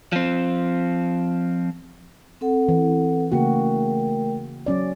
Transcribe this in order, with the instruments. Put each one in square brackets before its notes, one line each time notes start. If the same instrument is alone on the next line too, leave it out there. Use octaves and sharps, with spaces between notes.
[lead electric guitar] F3 C4
[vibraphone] C4 A4 F#5
[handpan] E3
[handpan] C#3 A#3 F#4 [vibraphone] A3 A#4 G5
[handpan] F#3 C#4 D5